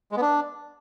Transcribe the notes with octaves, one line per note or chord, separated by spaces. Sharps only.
G#3
B3
D4